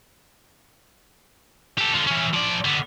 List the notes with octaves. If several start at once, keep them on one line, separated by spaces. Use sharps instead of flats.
G4 A4
D3 F4
E3 C#4
F3 D5
D3 B3